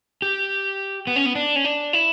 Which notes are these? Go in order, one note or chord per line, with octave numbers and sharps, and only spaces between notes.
G4
B3
C#4
B3
D4
C#4
D4
E4